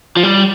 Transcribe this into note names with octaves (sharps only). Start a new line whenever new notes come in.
F3
G3